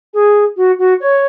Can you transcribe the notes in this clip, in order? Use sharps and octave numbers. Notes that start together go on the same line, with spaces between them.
G#4
F#4
F#4
C#5